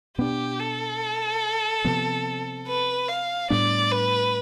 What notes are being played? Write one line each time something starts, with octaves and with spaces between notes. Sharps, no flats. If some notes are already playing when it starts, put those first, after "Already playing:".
B2 B3 D4 G4
A4
C3 F3 B3
B4
F5
A2 G3 B3 D4 D5
B4